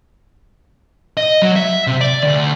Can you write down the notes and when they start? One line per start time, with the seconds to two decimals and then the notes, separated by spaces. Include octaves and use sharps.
1.17 D#5
1.42 F#3
1.56 E5
1.87 C3
2.01 D5
2.23 D2